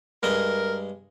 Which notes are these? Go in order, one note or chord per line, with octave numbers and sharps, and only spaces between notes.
G2 G#3 A#4 D#5